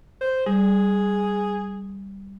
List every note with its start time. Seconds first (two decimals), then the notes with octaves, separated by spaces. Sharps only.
0.21 C5
0.46 G3 G#4